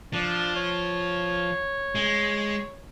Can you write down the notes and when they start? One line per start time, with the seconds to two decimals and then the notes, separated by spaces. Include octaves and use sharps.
0.13 F3 D4
0.56 C#5
1.95 G#3